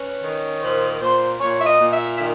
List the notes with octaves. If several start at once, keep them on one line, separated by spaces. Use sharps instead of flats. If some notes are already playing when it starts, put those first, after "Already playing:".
Already playing: C#4 B4
D#3
A#2 C5
A#2 C5
A#2 C#5
E5
D#5
A#2
E5
E5
D#3